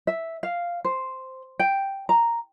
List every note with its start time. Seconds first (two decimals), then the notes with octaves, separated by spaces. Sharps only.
0.07 E5
0.43 F5
0.84 C5
1.59 G5
2.09 A#5